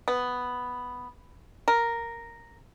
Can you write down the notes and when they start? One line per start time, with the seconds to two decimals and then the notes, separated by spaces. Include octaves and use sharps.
0.08 B3
1.68 A#4